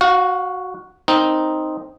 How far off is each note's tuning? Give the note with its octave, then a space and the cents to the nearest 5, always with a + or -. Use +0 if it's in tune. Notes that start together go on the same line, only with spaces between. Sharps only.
F#4 +0 F5 +35
C4 +0 D#4 +0 A#4 +0